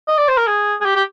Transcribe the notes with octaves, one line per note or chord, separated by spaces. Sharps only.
D#5
D5
C5
A#4
G#4
G#4
G4
G4